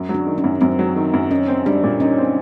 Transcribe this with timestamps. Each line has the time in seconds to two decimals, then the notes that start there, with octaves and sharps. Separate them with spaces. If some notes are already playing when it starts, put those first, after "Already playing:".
Already playing: F#2
0.09 F#3
0.15 D4
0.27 D#3
0.38 C#4
0.44 F#2
0.61 F#2 C4
0.79 F#3
0.96 D#3
1.14 F#2
1.31 C#4 D#4
1.48 C4
1.66 G3 D4
1.84 A#2
2.00 C#4 D#4
2.18 C4